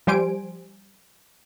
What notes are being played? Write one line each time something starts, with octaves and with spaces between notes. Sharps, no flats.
F3 G3 G4 C5 G#5 D7